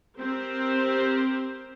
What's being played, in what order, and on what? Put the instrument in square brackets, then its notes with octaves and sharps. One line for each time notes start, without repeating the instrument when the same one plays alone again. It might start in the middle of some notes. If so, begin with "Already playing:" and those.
[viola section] C4 G4 A#4 C5